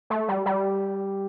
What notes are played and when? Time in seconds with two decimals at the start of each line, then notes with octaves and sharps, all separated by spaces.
0.10 A3
0.28 G3
0.46 G3